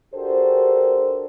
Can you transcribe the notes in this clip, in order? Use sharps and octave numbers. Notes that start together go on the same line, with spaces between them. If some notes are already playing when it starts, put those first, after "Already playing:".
D4 F#4 G4 A4 A#4 C5